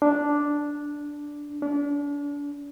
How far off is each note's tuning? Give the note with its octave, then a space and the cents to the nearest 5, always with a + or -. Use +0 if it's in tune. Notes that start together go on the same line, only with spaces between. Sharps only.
D4 -5
D4 -35